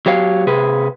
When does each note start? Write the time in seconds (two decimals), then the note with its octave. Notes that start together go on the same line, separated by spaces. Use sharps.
0.06 F#3 G4 C#5 F5
0.47 C3 G#4 B4